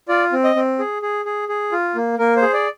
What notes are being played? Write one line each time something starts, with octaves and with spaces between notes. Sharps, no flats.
F4 D5
C4
D#5
C4
G#4
G#4
G#4
G#4
F4
A#3
A#3 A#4
C5
G#4
D5